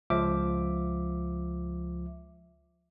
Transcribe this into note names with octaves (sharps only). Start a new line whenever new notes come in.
C#2 F3 E5 D6